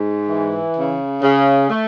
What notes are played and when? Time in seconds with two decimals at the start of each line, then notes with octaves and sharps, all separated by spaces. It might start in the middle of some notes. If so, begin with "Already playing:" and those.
Already playing: G#2
0.29 E3
0.76 C#3
1.23 C#3
1.70 A3